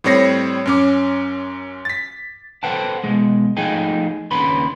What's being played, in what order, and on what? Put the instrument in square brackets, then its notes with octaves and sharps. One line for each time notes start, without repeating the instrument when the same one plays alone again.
[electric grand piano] A2 G3 C4 C#5 A#6 C7
F#2 C#4 D6
A6 B6
[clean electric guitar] A4 B4 C5 F#5 G5 A5
B2 G#3
F3 A3 D#4 G#4 G5 G#5
D#2 C#3 D4 B4 B5 C6